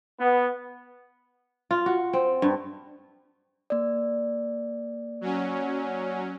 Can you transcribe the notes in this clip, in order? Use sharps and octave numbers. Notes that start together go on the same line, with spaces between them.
B3
F4
F#4
C4
G2
A#3 D5
F#3 C#4